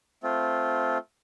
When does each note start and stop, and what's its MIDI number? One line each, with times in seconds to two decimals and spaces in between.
0.23 0.98 57
0.23 0.98 60
0.23 0.98 65